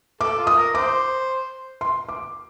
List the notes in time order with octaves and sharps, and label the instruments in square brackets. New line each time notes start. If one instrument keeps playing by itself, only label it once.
[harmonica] A4 [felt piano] D6
[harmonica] F4
[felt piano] D#6
[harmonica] A#4
[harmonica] C5 [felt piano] D6
[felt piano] C6
D6